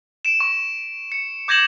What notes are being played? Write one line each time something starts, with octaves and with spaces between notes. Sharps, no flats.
D7 E7
C#6
C#7
D6 G6 G#6 A#6 E7 F#7